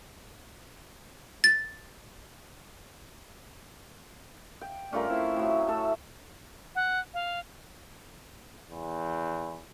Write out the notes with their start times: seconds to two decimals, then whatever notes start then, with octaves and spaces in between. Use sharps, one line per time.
1.44 A6
4.61 G5
4.93 G2 A3 C#4 F4 A#4 D5
5.10 A3 C4 E4
5.36 A2 F#3
5.67 A3 A4 E5
6.75 F#5
7.14 F5
8.70 E2